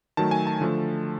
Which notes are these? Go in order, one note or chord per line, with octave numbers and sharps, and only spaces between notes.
D#3 F#3 A3 A5
G#5
A5
D3 F3 A3